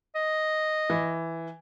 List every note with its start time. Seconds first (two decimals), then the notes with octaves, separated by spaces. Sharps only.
0.15 D#5
0.90 E3